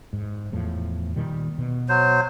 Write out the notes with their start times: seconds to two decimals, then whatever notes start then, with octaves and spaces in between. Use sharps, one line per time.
0.13 G#2
0.52 E2 A2 F3
1.16 A#2 D#3 G3
1.58 B2
1.89 F#3 C5